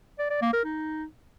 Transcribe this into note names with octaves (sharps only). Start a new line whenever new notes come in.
D5
D5
A#3
A#4
D#4